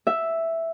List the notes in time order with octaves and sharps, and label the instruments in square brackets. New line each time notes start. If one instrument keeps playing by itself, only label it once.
[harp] E5